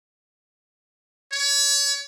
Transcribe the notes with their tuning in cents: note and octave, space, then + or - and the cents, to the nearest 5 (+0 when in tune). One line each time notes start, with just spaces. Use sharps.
C#5 +35